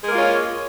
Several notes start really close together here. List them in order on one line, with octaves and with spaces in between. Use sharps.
G#3 A#4 A#3 F4 C#4